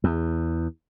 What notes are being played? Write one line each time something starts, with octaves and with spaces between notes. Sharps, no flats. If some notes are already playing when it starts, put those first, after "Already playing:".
E2